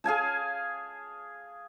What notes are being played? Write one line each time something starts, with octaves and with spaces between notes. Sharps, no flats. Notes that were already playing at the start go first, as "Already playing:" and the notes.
G#4 F5 G#5 A5